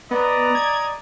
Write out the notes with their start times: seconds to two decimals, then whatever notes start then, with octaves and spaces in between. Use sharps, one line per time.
0.11 B3 D5 D#5 A#5
0.55 G#6